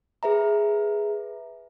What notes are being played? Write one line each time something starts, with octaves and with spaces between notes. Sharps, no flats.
G#4 B4 E5 A#5